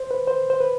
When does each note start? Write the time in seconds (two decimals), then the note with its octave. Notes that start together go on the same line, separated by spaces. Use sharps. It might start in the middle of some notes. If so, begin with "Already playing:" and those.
Already playing: C5
0.11 B4
0.28 C5
0.50 C5
0.60 B4